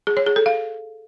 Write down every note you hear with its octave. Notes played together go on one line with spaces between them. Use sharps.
G#4
C#5
G#4
A4
F5